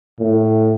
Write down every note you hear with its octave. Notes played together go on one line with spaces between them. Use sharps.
A2